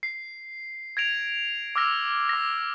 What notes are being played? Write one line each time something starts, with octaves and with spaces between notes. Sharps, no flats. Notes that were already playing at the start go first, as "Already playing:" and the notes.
C7
G#6 A#6 D7 F7
D6 E6 F6 A#6
D6 A#6